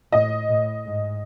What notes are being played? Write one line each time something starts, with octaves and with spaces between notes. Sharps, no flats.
A2 D#5
A2
G#2